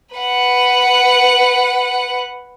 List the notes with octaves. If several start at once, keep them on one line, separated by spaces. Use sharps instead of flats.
B4 F#5